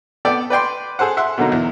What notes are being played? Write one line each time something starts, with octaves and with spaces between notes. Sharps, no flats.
B3 A4 D5 G5
B4 D5 G5 C6
G#4 A4 C5 F#5
E5 F#5 C6
B2 D3 F#3 A#3 D#4
E2